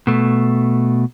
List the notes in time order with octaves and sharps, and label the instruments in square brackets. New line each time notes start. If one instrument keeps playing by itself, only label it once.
[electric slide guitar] B2 A3